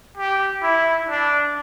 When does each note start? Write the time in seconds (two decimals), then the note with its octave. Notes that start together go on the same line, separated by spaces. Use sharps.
0.17 G4
0.62 E4
1.09 D4